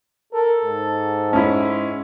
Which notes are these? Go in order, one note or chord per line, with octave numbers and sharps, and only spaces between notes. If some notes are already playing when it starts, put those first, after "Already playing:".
A4 A#4
G#2
G#3 C#4 E4